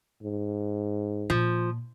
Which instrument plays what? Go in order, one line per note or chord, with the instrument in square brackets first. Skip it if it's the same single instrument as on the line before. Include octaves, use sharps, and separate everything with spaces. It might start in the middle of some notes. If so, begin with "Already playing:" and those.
[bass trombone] G#2
[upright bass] A#2 [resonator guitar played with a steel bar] F3